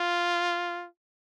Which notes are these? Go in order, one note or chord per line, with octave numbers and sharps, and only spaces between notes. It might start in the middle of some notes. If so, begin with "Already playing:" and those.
Already playing: F4